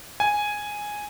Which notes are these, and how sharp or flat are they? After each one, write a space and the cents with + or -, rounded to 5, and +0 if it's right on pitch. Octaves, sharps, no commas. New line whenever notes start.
G#5 +0